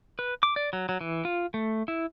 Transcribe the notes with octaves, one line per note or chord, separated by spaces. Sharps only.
B4
D6
D5
F#3
F#3
E3
F4
A3
E4